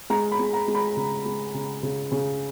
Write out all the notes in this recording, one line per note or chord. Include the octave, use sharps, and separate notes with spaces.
G#3 A#5
B5
G#3
A#5
G#3
B5
C#3
G#3
C#3
C#3
C#3